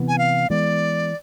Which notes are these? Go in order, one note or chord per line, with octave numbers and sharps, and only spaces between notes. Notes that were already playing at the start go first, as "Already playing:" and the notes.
Already playing: C3 E3 B3
G#5
F5
E3 G#3 B3 D5